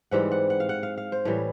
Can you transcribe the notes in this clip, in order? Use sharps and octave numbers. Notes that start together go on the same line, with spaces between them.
G#2 E3 G3 C4 F#5
F#5
F#5
F5
F#5
F5
F5
C5
A2 E3 G3 C#5